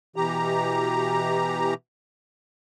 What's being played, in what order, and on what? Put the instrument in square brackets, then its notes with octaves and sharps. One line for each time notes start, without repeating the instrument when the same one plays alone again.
[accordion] B2 E3 G4 A#5